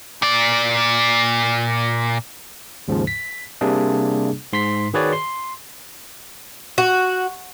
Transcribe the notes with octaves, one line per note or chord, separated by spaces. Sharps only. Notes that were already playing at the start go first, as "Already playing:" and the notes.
A#2 D5
D#2 G#2 C#3 F3
B6
C3 G3 A#3 D4 G#4
G#2 C6 B6
D#3 F#4 G#4 B4 C#5 D5
C6
F#4